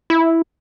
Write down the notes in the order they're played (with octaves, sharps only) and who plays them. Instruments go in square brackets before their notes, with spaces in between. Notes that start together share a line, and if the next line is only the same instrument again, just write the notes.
[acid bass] E4